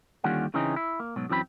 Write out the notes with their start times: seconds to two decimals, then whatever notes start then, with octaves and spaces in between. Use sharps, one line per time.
0.24 D#2 D3 G3 C#4 F4 F#5
0.54 C#3 E3 C4 C#4 D#4
0.76 E4
1.00 A#3
1.16 G#2 B2 F#3
1.29 F#2 E3 F#3 C4 A#4 B5